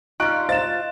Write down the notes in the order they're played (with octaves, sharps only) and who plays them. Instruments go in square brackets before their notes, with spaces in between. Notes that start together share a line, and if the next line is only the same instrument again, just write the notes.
[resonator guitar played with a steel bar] G3 D#4 [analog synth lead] F4 [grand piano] C#6 F#6 D7
[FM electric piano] C5 D#5 F5 [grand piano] A6 E7